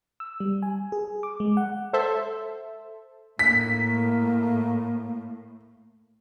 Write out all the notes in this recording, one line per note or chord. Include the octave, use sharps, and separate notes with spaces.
E6
G3
G#5
G#4
D6
G#3
F#5
A4 C5 E5
A2 A#3 B6